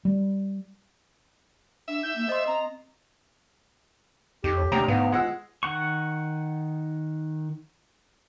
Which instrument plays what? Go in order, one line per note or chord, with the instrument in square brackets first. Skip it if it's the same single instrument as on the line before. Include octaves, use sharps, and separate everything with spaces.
[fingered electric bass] G3
[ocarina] D4 [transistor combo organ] E5
[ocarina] D#4 [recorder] G6
[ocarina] A#3
[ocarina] C5 [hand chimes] D#5 C6
[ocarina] C4 [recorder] A#5
[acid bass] F2 [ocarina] D#4 [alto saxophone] G4
[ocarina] C#5
[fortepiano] D2 G5 A#5 [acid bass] C3
[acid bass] G#2 [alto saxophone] B3 [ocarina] F5
[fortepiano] G#3 F#5 E6 [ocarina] F4
[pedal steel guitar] D#3 F#5 C#6